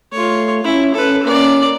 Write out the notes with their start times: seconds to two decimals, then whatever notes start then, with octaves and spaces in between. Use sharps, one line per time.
0.13 A3 F4 C#5
0.64 C#4 E4
0.94 C#4 A4 B4
1.23 A#3 C#4 D5